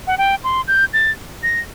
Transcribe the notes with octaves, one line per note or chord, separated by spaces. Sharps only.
F#5
G5
C6
G6
A6
A#6